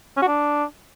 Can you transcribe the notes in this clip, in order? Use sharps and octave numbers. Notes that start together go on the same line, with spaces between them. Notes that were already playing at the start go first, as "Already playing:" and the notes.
C#4
F#4
D4